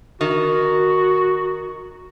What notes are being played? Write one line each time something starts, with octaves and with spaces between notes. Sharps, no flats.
D#3 F#4